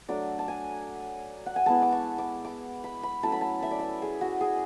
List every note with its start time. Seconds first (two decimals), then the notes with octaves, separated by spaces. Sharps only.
0.08 F#3 A3 D4 D5
0.39 A5
0.48 G#5
1.46 F#5
1.56 G#5
1.66 G#3 B3 E4 A5
1.82 D6
1.92 C#6
2.18 D6
2.45 D6
2.84 B5
3.03 B5
3.23 F#3 A3 C#4 E4 A5
3.32 B5
3.41 A5
3.62 E5
3.71 D5
3.79 E5
4.02 G#4
4.21 F#4
4.41 G#4